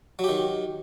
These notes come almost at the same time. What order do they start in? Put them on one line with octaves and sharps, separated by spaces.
F#3 G4 D#3